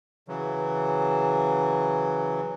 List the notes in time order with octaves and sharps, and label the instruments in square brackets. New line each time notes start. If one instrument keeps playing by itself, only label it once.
[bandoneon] C#3 E3 F#3